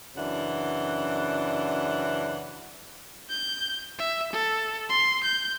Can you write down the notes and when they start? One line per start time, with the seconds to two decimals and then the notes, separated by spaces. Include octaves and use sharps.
0.15 F#2 C#3 E3 D4 F#5
3.29 G6
3.98 E5
4.33 A4
4.90 C6
5.24 G6